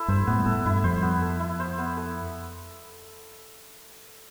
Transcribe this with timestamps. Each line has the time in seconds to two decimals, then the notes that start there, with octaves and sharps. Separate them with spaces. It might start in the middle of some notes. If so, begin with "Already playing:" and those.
Already playing: E4 A4
0.08 G2 C5
0.27 A2 B3
0.46 A2 A4
0.66 G2 E4
0.84 F2 C5
1.02 B3
1.22 A4
1.40 E4
1.60 C5
1.78 B3
1.97 A4